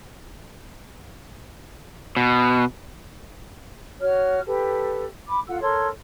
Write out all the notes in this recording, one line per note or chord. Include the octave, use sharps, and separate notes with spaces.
B2
F#4 C#5 F6
G4 A4 B4
B5 D6
F4 A4 F#5 E6
A4 A#4 C#5 C6